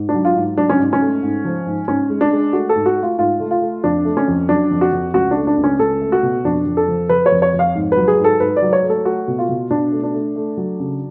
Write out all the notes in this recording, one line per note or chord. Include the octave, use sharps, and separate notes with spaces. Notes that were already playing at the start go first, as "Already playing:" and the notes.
Already playing: G#2
D4
F#3
F4
G#2
F#3 D4
C#4
G#2
C#4
A3
G#2
F3
G#2
G#2 C#4
G#3
D4
G#3
A3 F#4
A4
G#2
F#4
A3
F4
G#2 F4
A3
F4
A3
F2 D4
A3
C#4
F2
F#3 D4
F2
F#4
F2
C#2 F#4
A3 D4
D4
C#2
C#4
C#2 A4
A3
F#4
B2
F2 D4
F2
A4
F3
F3 B4
C#5
F2
C#5
F2
F5
G#2
F#3 B4
G#4
G#2
A4
G#2 B4
D5
F#3
C#5
A3
A4
A3 F#4
B2
F4
B2
B2 D4
A3
D4
A3
A3
F#3
C#3